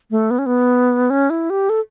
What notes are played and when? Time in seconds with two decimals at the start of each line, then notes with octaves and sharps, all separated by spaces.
0.11 A3
0.31 B3
0.39 C#4
0.46 B3
1.10 C#4
1.30 E4
1.50 G4
1.69 A4